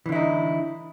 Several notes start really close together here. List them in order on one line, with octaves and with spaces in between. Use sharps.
E3 D3 E4 D#4